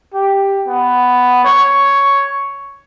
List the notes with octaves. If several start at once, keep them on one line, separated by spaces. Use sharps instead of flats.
G4
B3
C#5